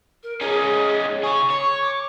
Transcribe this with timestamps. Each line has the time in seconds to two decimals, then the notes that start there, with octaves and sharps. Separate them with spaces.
0.23 A#4
0.41 C#4 D#4 G#4
1.23 G#4 C#5 C#6
1.50 C#5
1.81 D6